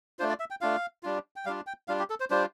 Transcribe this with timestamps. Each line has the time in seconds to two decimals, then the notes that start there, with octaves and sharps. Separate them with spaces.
0.19 A3 D4 F4 C5
0.29 D5
0.40 E5
0.50 G5
0.61 A3 D4 F4 F5
1.03 G3 D4 F4
1.36 G5
1.45 G3 F5
1.49 D4 F4
1.67 G5
1.88 G3 D4 F4 F5
1.99 G4
2.10 A4
2.20 C5
2.30 G3 D4 F4 C5